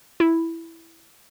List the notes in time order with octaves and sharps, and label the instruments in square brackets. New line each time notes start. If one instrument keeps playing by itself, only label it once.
[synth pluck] E4